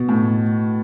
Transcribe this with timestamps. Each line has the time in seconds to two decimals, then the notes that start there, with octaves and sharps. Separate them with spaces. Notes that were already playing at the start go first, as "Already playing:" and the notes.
Already playing: B2
0.09 A2